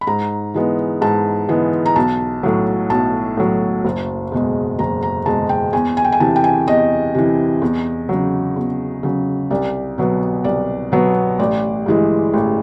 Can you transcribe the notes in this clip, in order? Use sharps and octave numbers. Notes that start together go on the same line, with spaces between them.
B5
G#2 A#5
E3 G#3 B3
G#2 A5
E3 G#3 B3
A#5
B1 A5
A2 F#3
B1 A5
A2 F#3
F#1
E2 B2 G#3
F#1 A#5
A#5
E2 B2 G#3 A5
G5
E2 G#5
G#5
G5
G#5
C3 E3 A5
G5
G#5
E2 D#5
C3 E3
E2
C#3 F#3
E2
C#3 F#3
C2 D5
B2 F#3 B3
C2 D5
B2 F#3 B3
A1 D5
G2 E3 G#3
A1